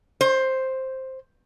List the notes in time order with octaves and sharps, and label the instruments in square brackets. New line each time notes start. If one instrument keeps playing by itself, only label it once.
[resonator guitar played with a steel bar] C5